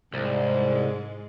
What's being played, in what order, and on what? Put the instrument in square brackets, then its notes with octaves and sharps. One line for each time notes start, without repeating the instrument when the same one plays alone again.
[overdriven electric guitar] C2 [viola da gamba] G#2 G#3